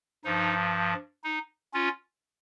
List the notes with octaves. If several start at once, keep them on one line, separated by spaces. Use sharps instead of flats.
G2 F3 D#4
D#4
C#4 F4